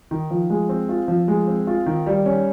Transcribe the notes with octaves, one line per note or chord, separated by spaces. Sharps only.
D#3
F3
G#3
C4
F4
F3
G#3
C4
F4
D#3
G3
C#4